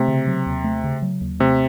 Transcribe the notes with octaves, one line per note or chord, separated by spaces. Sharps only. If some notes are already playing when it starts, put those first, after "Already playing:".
Already playing: C3 A3
C#3
F#3
D#2
A3
C#3
F#3
D#2
C3 A3